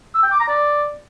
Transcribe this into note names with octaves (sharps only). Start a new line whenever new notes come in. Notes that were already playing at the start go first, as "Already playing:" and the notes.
E6
G5
D6
A#5
D5